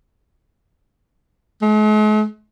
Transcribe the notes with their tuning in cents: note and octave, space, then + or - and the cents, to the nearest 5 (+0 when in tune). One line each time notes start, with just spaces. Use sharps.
G#3 +45